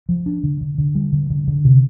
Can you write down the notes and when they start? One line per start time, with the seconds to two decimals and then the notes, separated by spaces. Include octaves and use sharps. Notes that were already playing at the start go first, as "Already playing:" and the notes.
0.09 F3
0.26 D4
0.43 D3
0.61 D3
0.78 D3
0.95 G3
1.13 D3
1.30 D3
1.48 D3
1.65 C3